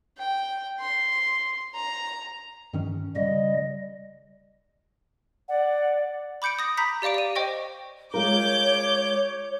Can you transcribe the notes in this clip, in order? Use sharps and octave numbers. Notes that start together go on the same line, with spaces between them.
G5
C6
A#5
G2 D#3 C#4
C#3 G3 D#5
D5 F#5
B5 D6 G6 C#7 D7
D#6 A#6
A#5 B5 G6 B6
G4 D5 F5 D6 D7
D5 D#7
C5 D#5 G5 C#6 A#6
G#3 F4 A#4 C#5 D6 G6